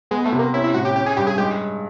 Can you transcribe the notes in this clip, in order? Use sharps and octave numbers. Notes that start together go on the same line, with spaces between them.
G#3 B3
A3
C3
A#3
C#4 E4
E4
A2 F#4
G4
C#4 G4
G#4
G2 G4
G#4
G#3 G4